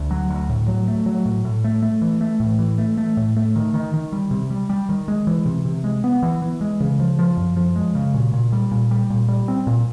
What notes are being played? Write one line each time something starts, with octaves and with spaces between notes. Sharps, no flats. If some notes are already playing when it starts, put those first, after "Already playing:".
Already playing: D2
F#3
D2
A2
F#3
A3
F#3
A2
A2
A3
A3
E3
A3
A2
E3
A3
A3
A2
A3
D#3
D#3
D#3
G3
C3
G3
G3
D#3
G#3
E3
C3
C3
G#3
B3
E3
E3
G#3
C#3
F3
F3
F#2
F3
G#3
C#3
A#2
A#2
G3
A#2
G3
A#2
G3
C4
A#2